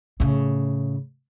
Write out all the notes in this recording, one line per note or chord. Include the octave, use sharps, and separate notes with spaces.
A2 C#3